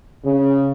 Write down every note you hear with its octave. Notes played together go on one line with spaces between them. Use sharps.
C#3